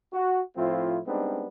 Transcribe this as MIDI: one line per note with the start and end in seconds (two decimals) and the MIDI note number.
0.13 0.40 66
0.57 1.00 45
0.57 1.00 53
0.57 1.00 57
0.57 1.00 60
0.57 1.00 64
0.57 1.00 65
1.06 1.46 55
1.06 1.46 56
1.06 1.46 59
1.06 1.46 60
1.06 1.46 62
1.06 1.46 63